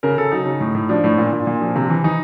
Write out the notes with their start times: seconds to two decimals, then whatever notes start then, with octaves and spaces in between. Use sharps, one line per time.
0.03 C#3 A#4
0.17 C#3 A4
0.32 F#3 D#4
0.46 C#3
0.60 A2
0.75 A2
0.89 F3 D4
1.04 A2
1.18 A#2
1.32 A#2
1.47 A#2
1.61 F3
1.76 C3
1.90 E3
2.04 E3 D#4